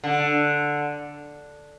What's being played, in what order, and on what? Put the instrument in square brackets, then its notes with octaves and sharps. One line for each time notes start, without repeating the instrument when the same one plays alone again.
[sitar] D3